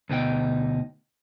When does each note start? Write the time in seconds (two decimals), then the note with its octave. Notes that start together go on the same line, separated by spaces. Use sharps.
0.09 D2 B2 D#4 G5